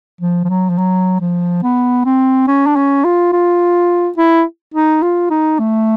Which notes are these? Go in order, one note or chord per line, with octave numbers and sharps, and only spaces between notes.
F3
F3
F#3
F3
F#3
F3
B3
C4
C#4
D4
C#4
F4
F4
E4
D#4
F4
D#4
A3